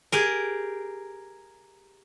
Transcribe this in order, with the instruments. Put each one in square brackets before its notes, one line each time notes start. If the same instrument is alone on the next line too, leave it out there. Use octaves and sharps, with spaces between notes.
[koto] G4 G#4 A#4